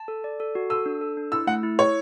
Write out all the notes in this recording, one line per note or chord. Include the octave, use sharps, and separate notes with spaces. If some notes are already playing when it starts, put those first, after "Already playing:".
Already playing: A5
A4
D5
A4
F#4
A4 E6
D4
A4
D4
E4 E6
A3 F#5
E4
E4 C#5